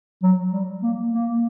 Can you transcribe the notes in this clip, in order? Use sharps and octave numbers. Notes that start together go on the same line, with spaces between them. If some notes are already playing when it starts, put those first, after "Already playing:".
F#3
G3
A#3
A#3